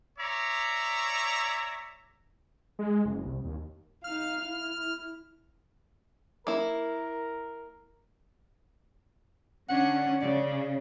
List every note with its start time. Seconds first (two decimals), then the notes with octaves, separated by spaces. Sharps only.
0.19 C#5 D5 E5 A#5
2.79 G#3
3.05 F#1
3.25 C2
3.44 D#2
4.04 D#4 F5 F6
4.44 E4
6.47 A#3 E4 A#4
9.69 D3 C#4 D4 F#5
10.22 C#3 D5